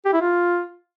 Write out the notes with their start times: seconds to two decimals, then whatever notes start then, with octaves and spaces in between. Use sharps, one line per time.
0.05 G4
0.13 E4
0.21 F4